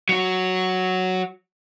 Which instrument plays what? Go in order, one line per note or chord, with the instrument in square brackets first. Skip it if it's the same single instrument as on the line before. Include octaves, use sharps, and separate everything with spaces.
[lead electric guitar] F#3 F#4